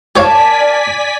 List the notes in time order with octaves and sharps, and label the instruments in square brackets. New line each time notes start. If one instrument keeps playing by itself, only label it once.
[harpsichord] G4 C#5 F5 [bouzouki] A#4 A5 [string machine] D5 G#5 B6